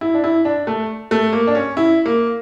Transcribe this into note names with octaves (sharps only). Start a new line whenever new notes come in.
E4
D4
E4
D4
A3
A3
A#3
D4
C#4
E4
A#3